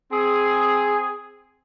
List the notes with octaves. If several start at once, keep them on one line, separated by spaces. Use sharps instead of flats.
C4 G#4